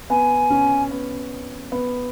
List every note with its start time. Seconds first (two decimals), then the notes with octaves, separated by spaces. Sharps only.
0.10 B3 G#5
0.50 C#4
0.91 B3
1.72 B3